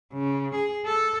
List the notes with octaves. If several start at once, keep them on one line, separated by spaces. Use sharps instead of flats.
C#3
G#4
A4